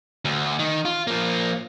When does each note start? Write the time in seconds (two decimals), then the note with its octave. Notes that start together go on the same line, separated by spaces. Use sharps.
0.25 D2
0.59 D#3
0.85 F4
1.07 F3 A#3